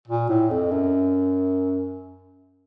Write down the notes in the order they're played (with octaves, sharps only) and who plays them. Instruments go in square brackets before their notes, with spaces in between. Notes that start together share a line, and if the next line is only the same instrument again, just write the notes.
[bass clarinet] A#2
A2
F2
F#2